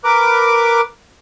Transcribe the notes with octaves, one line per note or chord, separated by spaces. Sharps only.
A#4 B4 D6